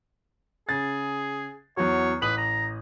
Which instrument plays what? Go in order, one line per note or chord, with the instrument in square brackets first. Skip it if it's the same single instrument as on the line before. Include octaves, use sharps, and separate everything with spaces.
[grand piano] C#3 A6 [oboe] G#4
[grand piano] E2 F#3 [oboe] C#5
[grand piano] A1 D#6 F#7 [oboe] B4
[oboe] A#5